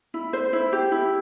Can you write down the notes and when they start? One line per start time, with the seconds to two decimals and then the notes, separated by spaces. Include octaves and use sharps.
0.14 E4
0.33 C5
0.53 E4
0.73 G4
0.92 E4